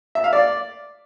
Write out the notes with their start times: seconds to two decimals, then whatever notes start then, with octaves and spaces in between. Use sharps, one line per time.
0.15 E5
0.24 F5
0.33 D5